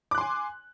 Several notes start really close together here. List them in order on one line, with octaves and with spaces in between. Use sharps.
D6 F#6 C6 G#5